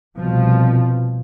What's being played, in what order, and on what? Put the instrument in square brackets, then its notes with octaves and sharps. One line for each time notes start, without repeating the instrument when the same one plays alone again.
[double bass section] C2 B2 F3